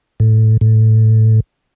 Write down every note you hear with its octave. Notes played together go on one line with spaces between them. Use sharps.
A2
A2